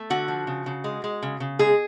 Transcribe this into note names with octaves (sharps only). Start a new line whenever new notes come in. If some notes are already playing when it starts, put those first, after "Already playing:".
Already playing: A3
D3 F#4
F3
C#3
C#3
G#3
G#3
C#3
C#3
G#3 G#4